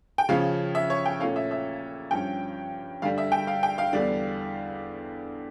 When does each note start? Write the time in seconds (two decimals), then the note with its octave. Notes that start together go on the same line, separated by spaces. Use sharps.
0.18 G5
0.29 C#3 F3 C#4 F5
0.75 E5
0.90 C#5
1.06 G5
1.20 A#2 A3 C#4 F5
1.36 E5
1.51 E5
2.11 G2 F3 C#4 G5
3.02 G2 D3 G3 F5
3.18 E5
3.32 G5
3.47 F5
3.63 G5
3.78 F5
3.93 E2 D3 G3 D4